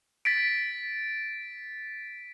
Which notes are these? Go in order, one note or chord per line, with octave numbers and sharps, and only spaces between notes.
A6 B6 D7